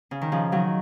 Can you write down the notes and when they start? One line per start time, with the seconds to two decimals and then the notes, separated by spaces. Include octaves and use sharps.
0.11 C#3
0.21 D#3
0.32 C#3 F3
0.52 D#3 F#3